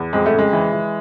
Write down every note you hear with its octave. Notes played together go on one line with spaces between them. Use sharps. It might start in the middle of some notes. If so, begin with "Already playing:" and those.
Already playing: E2
F2 G#3
A3
C#3
G#3
E3
E3